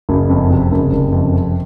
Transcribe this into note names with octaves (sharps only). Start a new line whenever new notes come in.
F#1
F2
C3
F#1
F#1
F2
C3